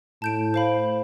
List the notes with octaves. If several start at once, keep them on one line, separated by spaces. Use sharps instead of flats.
A2 A5 G6 D7
C5 F5 B5